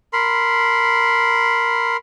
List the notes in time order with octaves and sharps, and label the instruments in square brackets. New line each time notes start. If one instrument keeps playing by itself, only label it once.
[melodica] A#4 B5 C6